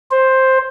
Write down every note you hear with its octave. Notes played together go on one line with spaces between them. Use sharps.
C5